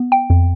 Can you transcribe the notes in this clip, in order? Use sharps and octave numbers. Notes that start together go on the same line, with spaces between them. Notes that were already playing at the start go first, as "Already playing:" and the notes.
Already playing: B3
G5
F2